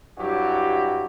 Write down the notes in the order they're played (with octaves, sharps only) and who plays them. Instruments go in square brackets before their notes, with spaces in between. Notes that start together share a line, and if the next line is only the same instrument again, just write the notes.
[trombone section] G2 F#3 E4 F#4 G4